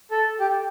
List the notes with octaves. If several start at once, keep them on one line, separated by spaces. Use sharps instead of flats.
A4
G4